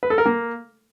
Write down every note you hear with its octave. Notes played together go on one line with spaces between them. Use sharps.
B4
A4
A#4
A#3